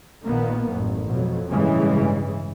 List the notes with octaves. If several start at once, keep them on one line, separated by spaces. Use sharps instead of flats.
A#1 A#2 D#3 A#3 B3
A1 F#2
F2 B2 F#3
A1 G2 C#3 E3 G#3